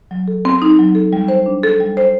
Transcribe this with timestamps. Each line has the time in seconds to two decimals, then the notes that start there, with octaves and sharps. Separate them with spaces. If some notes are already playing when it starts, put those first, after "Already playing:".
0.11 F#3
0.28 A4
0.45 C4
0.62 D#4
0.79 F#3
0.95 A4
1.13 G3
1.28 C5
1.46 D4
1.63 A4
1.80 G3
1.97 C5